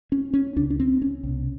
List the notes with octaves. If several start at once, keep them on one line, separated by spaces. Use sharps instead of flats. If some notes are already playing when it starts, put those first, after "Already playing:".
C#4
C#4
C#2 C#3 D4
D4
C4
C#4
C2 B2